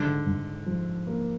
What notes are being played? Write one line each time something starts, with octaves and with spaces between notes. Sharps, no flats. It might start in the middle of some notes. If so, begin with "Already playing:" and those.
Already playing: G#2 D3
G#2
F3
A#3